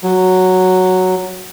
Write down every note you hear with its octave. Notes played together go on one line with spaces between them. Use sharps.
F#3